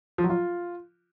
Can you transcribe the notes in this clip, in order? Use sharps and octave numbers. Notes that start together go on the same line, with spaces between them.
F3
F#3
F4